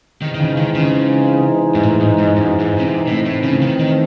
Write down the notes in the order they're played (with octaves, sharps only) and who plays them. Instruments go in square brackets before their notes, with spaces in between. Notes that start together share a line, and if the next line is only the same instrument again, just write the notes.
[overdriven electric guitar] D#3 [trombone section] E3 G#3 C4 D#4
[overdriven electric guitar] D#3
C#3
D#3
C#3
G#2
A2
G#2
G#2
F#2
G#2
C#3
C3
[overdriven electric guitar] A2 [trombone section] E3 A3 C4 D#4
[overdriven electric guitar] A2
C#3
D#3
D#3